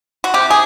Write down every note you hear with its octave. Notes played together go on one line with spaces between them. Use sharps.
F#4
C3 G4
G#4